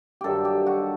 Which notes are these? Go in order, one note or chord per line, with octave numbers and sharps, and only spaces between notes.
G2 D#3 F#3 G4 A4
G4
F#4